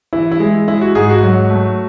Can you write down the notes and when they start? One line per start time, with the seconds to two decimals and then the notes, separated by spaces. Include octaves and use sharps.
0.13 E3 E4
0.32 E4
0.40 G#3
0.68 G#3 E4
0.81 F#4
0.95 G#2 G#4
1.10 F#4
1.23 F#3
1.50 A3